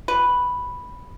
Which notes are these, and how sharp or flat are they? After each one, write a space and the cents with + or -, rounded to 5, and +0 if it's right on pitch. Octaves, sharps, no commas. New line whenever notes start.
G3 -30 B4 +0